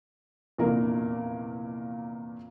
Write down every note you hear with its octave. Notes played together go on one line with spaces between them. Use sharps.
F1 E2 A#2 A#3 D4 A#4